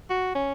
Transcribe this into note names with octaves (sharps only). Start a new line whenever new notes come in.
F#4
C#4